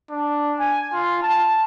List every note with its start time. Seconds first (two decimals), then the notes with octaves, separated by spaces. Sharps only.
0.10 D4
0.59 G#5
0.93 F4
1.23 A5